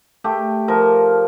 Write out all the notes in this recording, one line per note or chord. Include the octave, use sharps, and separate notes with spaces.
A3 G4
F3 A#4